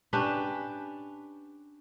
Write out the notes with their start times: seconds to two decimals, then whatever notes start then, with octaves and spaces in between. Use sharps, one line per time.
0.13 C#4 D4 G4 B4